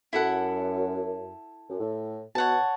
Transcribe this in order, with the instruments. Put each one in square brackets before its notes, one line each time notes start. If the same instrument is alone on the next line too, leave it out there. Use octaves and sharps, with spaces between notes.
[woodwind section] F#2 [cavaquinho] E4 A4 F#5
[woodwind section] F#2
A2
[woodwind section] B2 [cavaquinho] C#5 F#5 A5